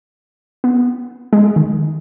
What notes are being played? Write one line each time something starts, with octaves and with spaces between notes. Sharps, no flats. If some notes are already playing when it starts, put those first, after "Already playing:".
B3
G#3
D#3